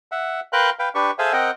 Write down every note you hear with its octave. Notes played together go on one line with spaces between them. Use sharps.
E5 F#5
A#4 B4 F5 G5 C6 F#6
B4 F5 G5
D4 G4 B4 C#6
G#4 A4 C5 E5 F5 G#5
C4 A#4 D#5 F#5 G5